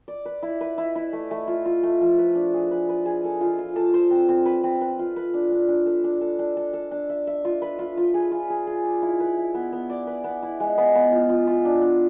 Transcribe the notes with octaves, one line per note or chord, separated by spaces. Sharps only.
D5
B4
E4
B4
E4
E4
A3
A3
F4
F4
A3
F3
B4
D4
G#4
B4
B4
G#4
A4
F4
F4
A4
C5
C4
C4
B4
C4
B4
F4
B4
D4
D4
D4
A4
D4
A4
D4
A4
A4
D4
E5
E5
F4
B4
F4
F4
G#4
F4
G#4
G#4
D5
E4
B4
E4
B3
B3
D5
B4
B3
E4
G#3
B3
B3
F4
F4
F4
D4
D4